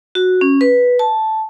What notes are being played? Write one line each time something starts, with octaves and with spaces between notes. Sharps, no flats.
F#4
C#4
B4
A5